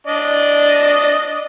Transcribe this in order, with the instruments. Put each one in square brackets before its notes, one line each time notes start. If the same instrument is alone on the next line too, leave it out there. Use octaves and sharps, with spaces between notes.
[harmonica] D4 D5 D#5